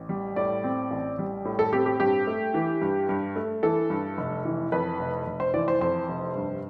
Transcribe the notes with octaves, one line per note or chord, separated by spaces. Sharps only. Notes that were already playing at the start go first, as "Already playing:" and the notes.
Already playing: A1
G3
A2 D5
C4
A1
G3
A2
A4
C4 G4
G4
G2 G4
A3
E3
G2
G2
A3
E3 A4
G2
F1
E3
F2 B4
F1
F1
C5
E3 D5
C5
F2 C5
F1
G2